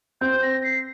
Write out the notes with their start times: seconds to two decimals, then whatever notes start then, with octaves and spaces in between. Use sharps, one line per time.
0.21 C4 G6
0.42 A#6
0.64 C7